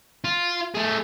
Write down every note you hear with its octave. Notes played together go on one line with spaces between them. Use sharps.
F4
A3 G#4